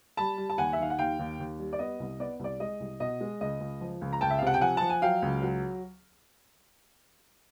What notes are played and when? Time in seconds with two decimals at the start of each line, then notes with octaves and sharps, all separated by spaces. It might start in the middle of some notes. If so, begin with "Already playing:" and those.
0.17 G3 A5 B5
0.38 G3
0.50 A5
0.58 D#2 F#5 G#5
0.73 E5
0.79 D#3 F5
0.90 F#5
0.98 D#2 F5 G5
1.19 D#2
1.39 D#2
1.59 G3
1.73 D5
1.79 B3 D#5
2.00 C2
2.19 B3 D5
2.39 C2 D5
2.60 G#3 D#5
2.80 C2
3.00 B2 D#5
3.21 G#3
3.41 C#2 D#5
3.60 C#2
3.81 F3
4.01 C#2
4.13 A#5
4.21 C#2 G5 A5
4.30 E5
4.38 F5
4.42 C3 F#5
4.54 G5
4.61 F3 F#5 G#5
4.77 F3 A5
4.90 G#5
5.02 F#3 F5 G5
5.22 C#2
5.42 F#3